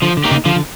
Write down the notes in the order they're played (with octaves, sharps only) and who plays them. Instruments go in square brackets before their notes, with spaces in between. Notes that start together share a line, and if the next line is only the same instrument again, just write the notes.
[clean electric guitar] D3 [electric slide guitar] F3
[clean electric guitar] D3
[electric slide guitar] A#3 D#4 G4
[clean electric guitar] C#3
[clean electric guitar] D3 [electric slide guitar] F3
[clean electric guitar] D3